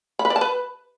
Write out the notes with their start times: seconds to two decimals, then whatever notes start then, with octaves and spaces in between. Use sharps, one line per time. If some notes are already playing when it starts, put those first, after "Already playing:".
0.19 B5
0.25 B4
0.30 D5
0.36 A5
0.41 B4